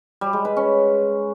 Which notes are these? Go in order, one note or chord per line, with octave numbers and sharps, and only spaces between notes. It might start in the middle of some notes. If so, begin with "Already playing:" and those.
G3
G#3
B4
C#4